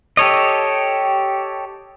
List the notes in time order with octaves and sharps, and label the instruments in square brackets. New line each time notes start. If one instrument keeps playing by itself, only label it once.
[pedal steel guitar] G4 A4 C#5 D#5